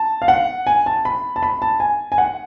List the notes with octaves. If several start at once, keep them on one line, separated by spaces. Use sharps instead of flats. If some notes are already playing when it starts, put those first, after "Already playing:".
Already playing: A5
F5
F#5
G#5
A5
B5
A5
B5
A5
G#5
G#5
F#5